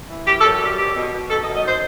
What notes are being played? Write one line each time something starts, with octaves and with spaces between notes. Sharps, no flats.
E3
F#2 G4
A4
F#2
A4
G3 G4
B2 G4
B2
B2
D#4 A4
D#5
F#2
D#5
D#4 C5